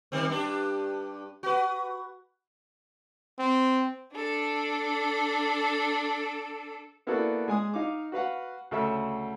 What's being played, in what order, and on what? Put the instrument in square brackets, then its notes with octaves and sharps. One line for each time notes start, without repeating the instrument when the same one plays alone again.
[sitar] D#3 G3 C4
G2 D4 G4
F#4 B4
[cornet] C4
[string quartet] D4 A4
[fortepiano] A#3 B3 E4 F#4 A4 D5
G#3 G#5 D#6
D#4 F5 D6
F#4 B4 F5 F#5
D2 C#3 A4 E5 E6